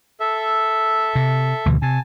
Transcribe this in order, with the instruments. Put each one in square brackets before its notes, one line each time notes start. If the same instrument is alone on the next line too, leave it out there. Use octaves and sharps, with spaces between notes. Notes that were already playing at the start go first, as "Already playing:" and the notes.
[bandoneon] A4 E5
[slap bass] C3
D2 B2 E3
[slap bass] C3 [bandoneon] G#5 A5